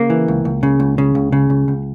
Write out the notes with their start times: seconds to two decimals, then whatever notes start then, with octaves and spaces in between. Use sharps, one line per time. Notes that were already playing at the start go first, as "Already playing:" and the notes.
Already playing: C#3 A#3
0.10 E3
0.28 C#2
0.45 C#2
0.63 C#3
0.80 C#2
0.98 C#3
1.15 C#2
1.32 C#3
1.50 C#2
1.68 C#2